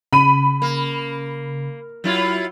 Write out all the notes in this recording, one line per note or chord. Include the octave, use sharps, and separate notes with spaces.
C#3 B5 D#7
A#3
F#3 E4 F4